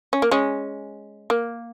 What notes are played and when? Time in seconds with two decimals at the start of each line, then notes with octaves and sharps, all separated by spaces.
0.13 C#4
0.22 A#3
0.31 G#3 C#4
1.30 A#3